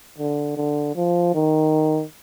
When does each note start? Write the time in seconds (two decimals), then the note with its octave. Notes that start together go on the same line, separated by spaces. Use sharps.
0.18 D3
0.57 D3
0.95 F3
1.34 D#3